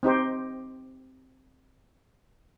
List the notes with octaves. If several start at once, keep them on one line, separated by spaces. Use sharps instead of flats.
C4 D#4 G4 C5